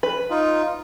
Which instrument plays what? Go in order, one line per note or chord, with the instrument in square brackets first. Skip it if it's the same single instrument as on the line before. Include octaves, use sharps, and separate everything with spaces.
[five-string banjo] B4
[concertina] D#4 F4